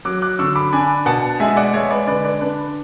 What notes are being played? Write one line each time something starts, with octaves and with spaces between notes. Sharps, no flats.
F#3 D6 F#6
D6 F#6
D3 C#6 E6
B5 D6
D4 G#5 B5
B2 F#5 A5
G#3 E5 G#5
D5 F#5
G#3 C#5 E5
B4 D5
D3 B4 D5
B4 D5
D4 B4